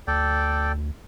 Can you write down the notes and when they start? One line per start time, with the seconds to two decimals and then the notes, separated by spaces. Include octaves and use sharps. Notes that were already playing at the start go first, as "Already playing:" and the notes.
0.07 D2 A4 D5 G5